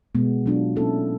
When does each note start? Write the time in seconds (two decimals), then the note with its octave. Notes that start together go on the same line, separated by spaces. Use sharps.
0.15 B2 G#3 B3
0.46 F#3 B3 D4 F4
0.76 A#3 C#4 E4 A4